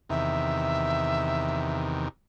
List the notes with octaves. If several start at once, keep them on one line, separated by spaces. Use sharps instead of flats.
E2 C3 D#3 E5